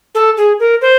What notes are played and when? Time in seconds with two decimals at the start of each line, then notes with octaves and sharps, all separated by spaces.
0.15 A4
0.37 G#4
0.60 A#4
0.82 C5